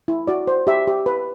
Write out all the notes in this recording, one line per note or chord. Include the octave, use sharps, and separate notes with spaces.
E4
F#4 D5
C5
G4 E5
G4
B4